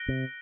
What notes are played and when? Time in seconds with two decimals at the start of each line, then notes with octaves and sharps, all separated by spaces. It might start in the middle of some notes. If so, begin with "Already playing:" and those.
Already playing: F#6 A#6 D7 G7
0.08 C3